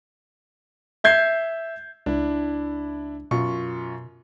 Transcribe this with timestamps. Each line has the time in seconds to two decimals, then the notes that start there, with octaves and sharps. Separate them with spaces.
1.04 E5 G6 G#6 C7
2.06 C#2 D4 E4
3.31 F#2 B2 F4 C#6